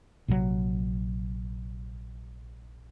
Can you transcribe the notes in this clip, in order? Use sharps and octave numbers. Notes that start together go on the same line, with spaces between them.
A#1 C3 E3 F#3